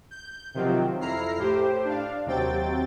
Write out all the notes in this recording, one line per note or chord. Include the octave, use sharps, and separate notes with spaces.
G6
C3 D#3 F3 F#3 C4
F2 E4 A#5 F6 C7
A2 G4 C5
D4 F5
D#2 C3 F#3 C4 G5 A6